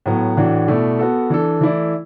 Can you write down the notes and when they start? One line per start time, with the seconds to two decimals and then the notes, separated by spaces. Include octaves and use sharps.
0.06 A2 F#3 B3
0.37 A2 E3 D4 F#4
0.68 B2 A3 E4 D5
0.99 B3 F#4 A4
1.30 E3 D4 A4
1.61 E3 A3 E4 D5